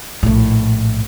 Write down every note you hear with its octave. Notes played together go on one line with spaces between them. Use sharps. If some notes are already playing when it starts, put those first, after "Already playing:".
A#1 A2